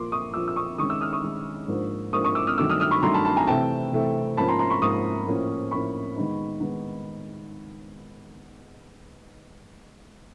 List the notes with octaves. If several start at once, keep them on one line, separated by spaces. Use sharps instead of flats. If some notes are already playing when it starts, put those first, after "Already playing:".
Already playing: A#2 F3 A#3 C6 D6
C#6 D#6
A#2 F3 A#3 D6 E6
E6
C#6 D#6
D#3 G#3 C#4 C#6 D#6
D6 E6
D#6 F6
C#6 D#6
D#3 G#3 C#4
G#2 F3 A#3 D4
G#2 F3 A#3 D4 C#6 D#6
C#6 D#6
D6 E6
D#6 F6
G2 D#3 F#3 A3 D6 E6
D#6 F6
D#6 F6
B5 C#6
G2 D#3 F#3 A3 A#5 C6
A5 B5
A5 B5
G#5 A#5
C3 E3 A3 C4 G5 A5
C3 E3 A3 C4
G#2 F3 A#3 C#4 A5 B5
A#5 C6
A#5 C6
B5 C#6
G#2 F3 A#3 C#4 C#6 D#6
A2 F3 A#3 C#4
A2 F3 A#3 C#4 B5 C#6
D#3 G#3 B3 D#4
D#3 G#3 B3 D#4